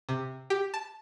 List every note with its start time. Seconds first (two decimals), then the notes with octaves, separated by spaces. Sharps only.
0.09 C3
0.50 G4
0.74 A5